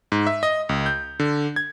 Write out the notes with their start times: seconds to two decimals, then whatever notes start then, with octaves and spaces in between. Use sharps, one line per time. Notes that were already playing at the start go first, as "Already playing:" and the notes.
0.12 G#2
0.27 E5
0.43 D#5
0.69 C#2
0.86 G6
1.20 D3
1.56 G#6